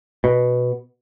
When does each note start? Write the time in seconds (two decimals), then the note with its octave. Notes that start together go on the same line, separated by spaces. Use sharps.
0.24 B2